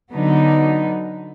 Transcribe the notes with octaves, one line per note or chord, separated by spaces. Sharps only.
D3 F#3 B3 D#4